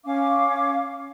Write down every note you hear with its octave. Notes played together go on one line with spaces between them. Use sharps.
C#4 F5 D6